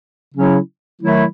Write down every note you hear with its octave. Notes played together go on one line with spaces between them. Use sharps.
C#3 F#3 C#4 E4
D#3 F#3 A3 E4